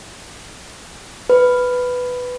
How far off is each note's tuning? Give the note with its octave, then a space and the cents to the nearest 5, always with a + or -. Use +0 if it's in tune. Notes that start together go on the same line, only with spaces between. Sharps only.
B4 +5